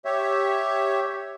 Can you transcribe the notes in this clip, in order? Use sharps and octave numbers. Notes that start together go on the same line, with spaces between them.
G4 C#5 E5